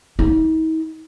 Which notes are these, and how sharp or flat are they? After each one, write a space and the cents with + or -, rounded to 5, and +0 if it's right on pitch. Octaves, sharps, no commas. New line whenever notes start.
D#4 +45